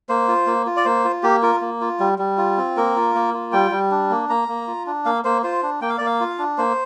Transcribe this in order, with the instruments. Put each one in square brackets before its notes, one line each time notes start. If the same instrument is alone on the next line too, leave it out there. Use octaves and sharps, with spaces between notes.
[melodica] A#3 C5
F4
A#3
F4
D5
A#3 C5
F4
A#3 G4
F4 A#4
A#3
F4
G3
G3
F4
C4
A#3 A#4
F4
A#3
F4
G3 G5
G3
D4
A#3
A#3 A#5
A#3
F4
D4
A#3 F5
A#3 C5
F4 C5
D4
A#3 G5
F5
A#3 D5
F5
F4
D4
A#3 C5